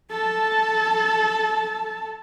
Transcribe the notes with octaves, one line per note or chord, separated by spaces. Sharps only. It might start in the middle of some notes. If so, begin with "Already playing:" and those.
A4 A5